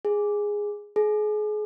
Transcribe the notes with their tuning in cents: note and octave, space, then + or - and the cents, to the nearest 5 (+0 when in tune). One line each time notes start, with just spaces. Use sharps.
G#4 -5
G#4 +30